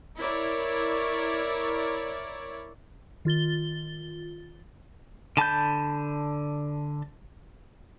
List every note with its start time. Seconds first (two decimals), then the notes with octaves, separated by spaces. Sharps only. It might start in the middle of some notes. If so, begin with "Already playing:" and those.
0.17 E4 A#4 C#5 D5
3.25 D#3 F4 A6 G7
5.37 D3 A5 B5 G6